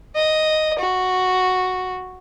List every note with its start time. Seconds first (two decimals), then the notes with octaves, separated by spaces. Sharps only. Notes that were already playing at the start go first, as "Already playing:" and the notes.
0.16 D#5
0.79 F#4